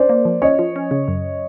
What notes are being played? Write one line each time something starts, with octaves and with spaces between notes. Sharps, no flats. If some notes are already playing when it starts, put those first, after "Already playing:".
Already playing: C#4 D4 C5 D5
A#3
F3
C#4 C#5 D#5
F3
C#4
C#3
F#2